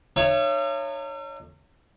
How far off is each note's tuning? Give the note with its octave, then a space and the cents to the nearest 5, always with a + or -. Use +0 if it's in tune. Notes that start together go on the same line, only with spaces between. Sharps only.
D#4 -40 C#5 +0 E5 +45